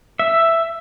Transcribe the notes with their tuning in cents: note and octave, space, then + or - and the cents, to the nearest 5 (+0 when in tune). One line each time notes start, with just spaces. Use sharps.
E5 +5